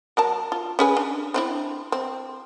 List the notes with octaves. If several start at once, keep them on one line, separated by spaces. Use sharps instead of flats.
F#3 A#4 A5
F4
C#4 G#4 B4
D4
C4 D4 E4
C4